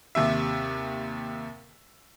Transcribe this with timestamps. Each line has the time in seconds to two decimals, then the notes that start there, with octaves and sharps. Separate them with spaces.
0.15 D#2 C3 E5